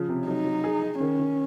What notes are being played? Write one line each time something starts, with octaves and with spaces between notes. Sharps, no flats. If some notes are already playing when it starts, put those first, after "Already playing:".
Already playing: C#3 F3
C3
F#3 D#4
F#3
G#4
G#4
D#3 C#4
D#3